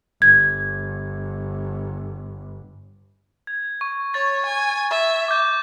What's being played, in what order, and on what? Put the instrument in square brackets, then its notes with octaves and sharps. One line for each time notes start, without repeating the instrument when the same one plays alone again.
[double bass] G1 [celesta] G#6
[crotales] G#6
C#6
[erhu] C#5 [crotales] A6
[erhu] G#5
E5
[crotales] D6 G6